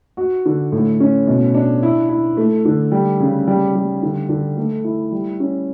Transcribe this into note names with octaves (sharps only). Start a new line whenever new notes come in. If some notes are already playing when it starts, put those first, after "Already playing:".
F#4
D3
A2
C#4
B2
D4
E4
E4
A3
D3
G3
C#3
G3
G3
D3
D3
A3
E4
G3
C#4